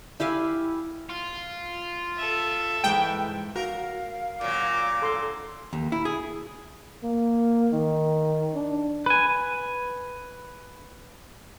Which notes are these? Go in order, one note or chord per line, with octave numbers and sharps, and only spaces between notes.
E4 G4 F5 G#5
F4
A4 E5
G#2 E3 G5
F#4 A#4 F5
A#2 F#3 D6
A4 C6
D#2
E4
G#4
A#3
D#3
D4
B4 G#5